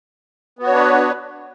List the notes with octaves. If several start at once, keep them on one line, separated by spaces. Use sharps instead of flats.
B3 D4 F#4 B4 C#5